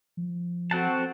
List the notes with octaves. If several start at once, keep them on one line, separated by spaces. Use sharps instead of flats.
F3
C4 F#4 A4 F#5 A5